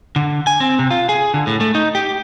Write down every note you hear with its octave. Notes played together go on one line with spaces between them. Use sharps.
D3
G#5
C4
C3
F4
G#4
D3
A2
A3
D#4
G4